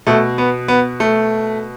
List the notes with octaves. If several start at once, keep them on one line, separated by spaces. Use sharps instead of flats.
B2 A3
B3
B3
A3